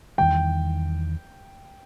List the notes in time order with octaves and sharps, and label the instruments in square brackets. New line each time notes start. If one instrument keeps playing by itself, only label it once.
[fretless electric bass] E2 D#3 G3 [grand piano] G5